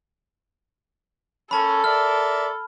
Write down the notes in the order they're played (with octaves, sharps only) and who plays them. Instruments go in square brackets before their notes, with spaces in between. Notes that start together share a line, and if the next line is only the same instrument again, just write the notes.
[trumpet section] A#3 C#4 [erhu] A4 [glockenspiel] A5 B5
[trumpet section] A#4 D5 E5 [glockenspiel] F6